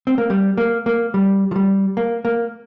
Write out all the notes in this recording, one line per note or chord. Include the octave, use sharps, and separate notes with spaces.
C4
A#3
G3
A#3
A#3
G3
F3
G3
A#3
A#3